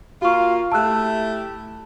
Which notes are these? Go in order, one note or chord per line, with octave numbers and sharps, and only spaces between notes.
A#3 F4 F#4 C#6
A3 E4 G4 A5 E6 F#6